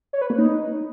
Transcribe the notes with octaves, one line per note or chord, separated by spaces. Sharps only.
C#5
B4
A#3
D#4